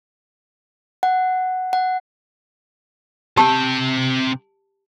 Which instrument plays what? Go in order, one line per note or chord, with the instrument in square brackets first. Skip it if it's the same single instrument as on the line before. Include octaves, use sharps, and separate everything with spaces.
[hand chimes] F#5
F#5
[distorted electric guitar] C3 G5 [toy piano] G4 A5 E6